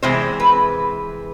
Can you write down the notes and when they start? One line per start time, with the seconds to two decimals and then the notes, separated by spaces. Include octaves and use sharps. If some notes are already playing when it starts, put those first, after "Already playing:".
0.03 C3 E3 G#3 C5
0.40 B4